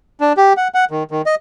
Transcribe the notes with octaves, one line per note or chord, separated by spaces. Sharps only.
D4
G4
F#5
F#5
D#3
D#3
D#5